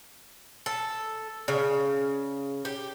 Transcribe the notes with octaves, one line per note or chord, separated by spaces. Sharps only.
A4
C#3
G4